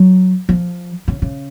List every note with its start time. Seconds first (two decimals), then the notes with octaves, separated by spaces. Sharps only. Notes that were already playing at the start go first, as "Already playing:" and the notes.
Already playing: F#3
0.49 F3
1.08 C#3
1.22 C#3